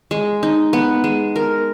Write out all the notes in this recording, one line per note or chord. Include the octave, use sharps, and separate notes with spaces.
G#3
D#4
B3
G#3
A#4